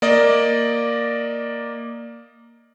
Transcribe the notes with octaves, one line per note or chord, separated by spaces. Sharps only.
A#3 D5 D#5